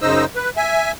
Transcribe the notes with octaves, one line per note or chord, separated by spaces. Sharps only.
F#2 C#3 D#4 C5 D#5 E6
B4
E5 G#5